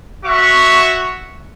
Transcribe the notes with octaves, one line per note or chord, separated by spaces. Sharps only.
F#4 C#5 E5 C#6